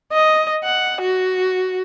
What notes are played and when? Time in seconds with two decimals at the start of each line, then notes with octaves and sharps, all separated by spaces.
0.12 D#5
0.64 F#5
1.01 F#4